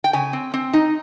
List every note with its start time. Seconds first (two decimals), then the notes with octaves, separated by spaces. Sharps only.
0.04 G5
0.13 C#3 G#5
0.33 C4
0.54 C4
0.73 D#4